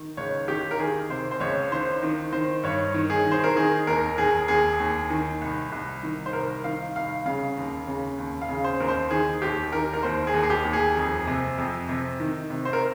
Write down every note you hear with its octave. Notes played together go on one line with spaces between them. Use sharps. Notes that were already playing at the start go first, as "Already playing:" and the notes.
Already playing: D#3
C#2 C#5
D#3 G4
A#4
D#3 G#4
C3 C5
C5
C#2 C#5
D#3 C5
D#3
D#3 C5
G2 C#5
D#3
G#4
D#3
C5
A#4
D#3 G#4
D#2 A#4
D#2 G#4
D#2 G#4
D#2
D#3
C2
C2
D#3
C5
C2 A#4
D#3 F5
C2 F5
C#3 F5
D#2
C#3
D#2
F5
C#3
C5
D#2 A#4
C5
D#3 G#4
D#2 G4
D#3 A#4
A#4
D#2 C5
G#4
D#2
G#4
G4
D#2
G#4
F2
C3
F2
C3
D#3
C3
C5
A#4